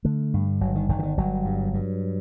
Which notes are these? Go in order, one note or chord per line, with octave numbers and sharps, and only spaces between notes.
D3 A3
G2
G1 F#3
D#3
G1 D#3
D3
D#3
G1 F#3
G2
G2